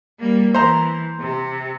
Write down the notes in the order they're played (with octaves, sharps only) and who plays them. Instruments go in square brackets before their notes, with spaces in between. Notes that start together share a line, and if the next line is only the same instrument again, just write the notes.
[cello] G3 A#3
[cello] E3 [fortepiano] C5 A#5
[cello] C3